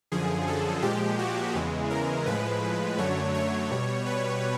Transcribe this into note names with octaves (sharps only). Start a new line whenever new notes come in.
F#2 D3 F3 G#4
A4
A#2 F3 G#3 G4
F#4
E2 C#3 E3 G#3
A#4
A2 F3 G#3 B4
F#2 D3 F#3 A3 C#5
C#5
B2 G3
B4